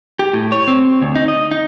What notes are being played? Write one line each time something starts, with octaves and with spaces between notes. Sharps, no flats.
G4
A2
C#5
C4
D2
D#4
D#5
D#4